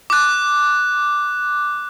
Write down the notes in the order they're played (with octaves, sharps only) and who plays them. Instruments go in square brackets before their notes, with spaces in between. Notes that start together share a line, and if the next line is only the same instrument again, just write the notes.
[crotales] D6 F#6